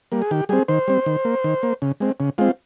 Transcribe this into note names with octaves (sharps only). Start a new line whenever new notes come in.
G3 A#3
G#4
D#3 G4
G3 C4 G#4
D#3 C5
G3 C4
D#3
A#3
D#3
A#3
C#3
G#3 C4
C#3
G#3 C4 F4